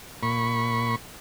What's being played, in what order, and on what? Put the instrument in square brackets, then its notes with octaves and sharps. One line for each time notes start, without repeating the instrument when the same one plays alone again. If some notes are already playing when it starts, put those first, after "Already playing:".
[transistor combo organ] A#2 B5 C#6